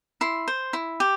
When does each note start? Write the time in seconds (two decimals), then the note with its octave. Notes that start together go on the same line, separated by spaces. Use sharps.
0.21 E4 C6
0.48 C5
0.73 E4
1.00 G4